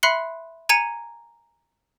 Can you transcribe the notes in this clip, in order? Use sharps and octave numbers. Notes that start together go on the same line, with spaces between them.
E5 B5 C6 F#6 C7 C#7
G#5 A#5 G#6 C#7 D#7